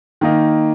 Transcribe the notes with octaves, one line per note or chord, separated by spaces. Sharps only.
D#3 A#3 D#4